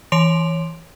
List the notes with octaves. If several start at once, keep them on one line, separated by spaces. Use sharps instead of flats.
E3 C#5 C6 D7 F7